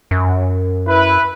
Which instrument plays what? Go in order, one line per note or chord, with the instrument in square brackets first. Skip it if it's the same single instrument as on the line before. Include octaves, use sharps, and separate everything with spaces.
[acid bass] F#2
[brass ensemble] E4 B4